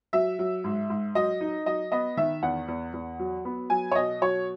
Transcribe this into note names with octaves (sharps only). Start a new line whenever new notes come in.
F#3 E5
F#3
G#2
G#2
F#3 D#5
D#4
F#3 D#5
B3 D#5
D#3 E5
E2 F#5
E2
E2
F#3
B3
F#3 G#5
C#5
B2 D#5
F#3 C#5